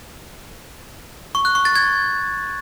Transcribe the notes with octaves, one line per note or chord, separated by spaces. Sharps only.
C#6
F#6
C#6
A6
G#6